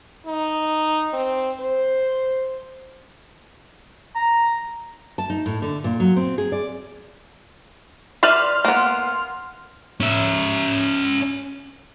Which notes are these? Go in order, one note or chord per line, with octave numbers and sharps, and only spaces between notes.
D#4
C4
C5
A#5
A5
D#4
A2
D3
A#2
F#3
C4
G#4
D5
B4 D5 E5 C6 F6
A#3 B3
C#4 E5